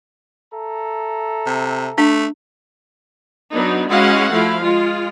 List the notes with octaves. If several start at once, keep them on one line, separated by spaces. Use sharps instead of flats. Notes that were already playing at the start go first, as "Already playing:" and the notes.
A4 E5 A#5
C3
A3 D4
F#3 B3 D4 D#4
G#3 C#4 E4 F#4 F5 F#5
F3 A3 E4 F5
G#3 F4